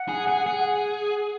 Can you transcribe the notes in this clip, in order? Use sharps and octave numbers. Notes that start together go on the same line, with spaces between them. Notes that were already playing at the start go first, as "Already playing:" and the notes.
Already playing: F#5
G#4
G#4
G#4